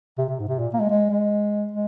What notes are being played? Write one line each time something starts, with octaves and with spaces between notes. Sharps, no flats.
C3
C3
G#2
C3
A#2
A#3
G#3
G#3
G#3
G#3